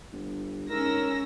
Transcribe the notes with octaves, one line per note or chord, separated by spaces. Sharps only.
G1
G#2 C#4 A#4 E6 A#6